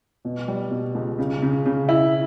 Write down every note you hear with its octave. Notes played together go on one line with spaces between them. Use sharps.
B2
G3
B2
C#2
C#3
C#3
C#3
E4